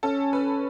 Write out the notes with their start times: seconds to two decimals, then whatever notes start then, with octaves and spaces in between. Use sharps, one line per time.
0.03 C#4 A4
0.33 B4